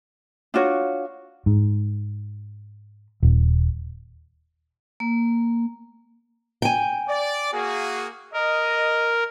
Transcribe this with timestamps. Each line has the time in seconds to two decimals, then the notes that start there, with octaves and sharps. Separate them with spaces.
0.54 D4 F4 F#4 C#5
1.46 G#2
3.23 D#1
5.00 A#3
6.62 G5 G#5
7.09 D5
7.52 A#3 F#4 G#4
8.33 A#4 D#5